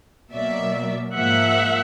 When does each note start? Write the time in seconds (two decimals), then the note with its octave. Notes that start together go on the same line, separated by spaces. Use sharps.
0.33 B2 F#3 A#3 D5 E5
1.14 G#2 F3 A#3 E5 F#5